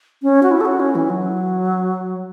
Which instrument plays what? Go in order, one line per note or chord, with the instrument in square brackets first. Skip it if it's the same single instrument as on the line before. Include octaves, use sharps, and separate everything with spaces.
[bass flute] C#4
F#4
E4
A4
F#4
C#4
E3
F#3